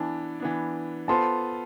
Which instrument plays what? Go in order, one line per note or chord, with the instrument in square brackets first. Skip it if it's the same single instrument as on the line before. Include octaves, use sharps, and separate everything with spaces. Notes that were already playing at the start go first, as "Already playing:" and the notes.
Already playing: [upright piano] E3 B3 D4 [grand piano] A5
[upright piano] E3 B3 D4
[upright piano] B3 F4 A4 C5 [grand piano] A5 C6